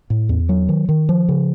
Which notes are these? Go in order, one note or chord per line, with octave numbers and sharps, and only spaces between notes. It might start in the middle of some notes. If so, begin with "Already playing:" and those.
A2
E2
F#3
D#3
D#3
F3
C#3